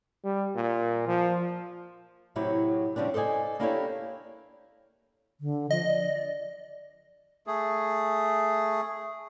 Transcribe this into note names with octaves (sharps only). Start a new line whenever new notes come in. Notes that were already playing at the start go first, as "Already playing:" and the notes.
G3
A#2
F3
A2 C3 F#3 E4 G4
F2 C#3 G3 C4 D4
A4 C5 D5 D#5 G#5
A#3 D4 E4 G4 A4 C#5
D3
F3 D#5
D5
A3 G#4